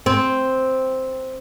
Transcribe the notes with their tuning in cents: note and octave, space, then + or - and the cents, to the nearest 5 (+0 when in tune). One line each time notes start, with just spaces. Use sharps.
C4 +0